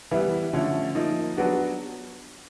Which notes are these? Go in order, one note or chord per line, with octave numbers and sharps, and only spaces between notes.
E3 G3 B3 E4
D3 F3 A3 C#4
F3 A#3 D#4
F#3 B3 D4 F#4